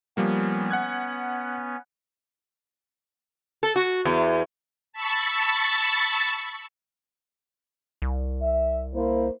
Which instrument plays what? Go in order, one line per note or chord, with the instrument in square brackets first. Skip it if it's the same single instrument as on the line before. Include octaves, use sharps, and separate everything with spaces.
[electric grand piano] F3 G3 A#3 [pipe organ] B3 C#4
[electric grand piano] F#5 F#6 G#6
[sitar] A4
F#4
E2
[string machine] A5 B5 C#6 E6 A6
[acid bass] C2
[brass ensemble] E5
A#3 E4 C5